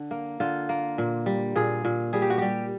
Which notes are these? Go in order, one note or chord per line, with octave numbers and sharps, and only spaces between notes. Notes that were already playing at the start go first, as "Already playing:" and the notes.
Already playing: D3
A#3
D3 F4
A#3
A#2
G3
A#2 G#4
A#2
G3 G#4
G4
F#4
G3 G4